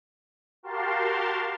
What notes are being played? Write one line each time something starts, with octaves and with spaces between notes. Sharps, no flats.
F#4 G4 A#4 F5 A5 C6